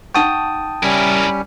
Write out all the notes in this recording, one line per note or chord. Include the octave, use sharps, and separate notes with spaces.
D#4 F#5 G5 A5 C#6 D#6
G3 C#4 E4 A#4